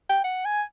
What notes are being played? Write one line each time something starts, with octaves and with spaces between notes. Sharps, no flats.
G5
F#5
G#5